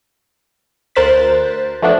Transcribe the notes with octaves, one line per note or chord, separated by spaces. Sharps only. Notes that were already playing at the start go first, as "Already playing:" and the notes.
D2 A#4 C5 F#6 A6 B6
F3 A3 B3 D4 F#4